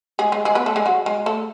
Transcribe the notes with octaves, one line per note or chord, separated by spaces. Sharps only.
G#3 G#4
G#3 G#4
G#3 G#4
B3 B4
A3 A4
G#3 G#4
F#3 F#4
G#3 G#4
A3 A4